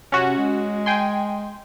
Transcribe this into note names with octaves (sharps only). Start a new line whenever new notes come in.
C3 C#4 F#4
G#3
G5 G#5 C6